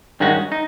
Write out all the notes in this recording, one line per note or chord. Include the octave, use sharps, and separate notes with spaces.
G2 D#3 G#3 C#4 F#4
D#4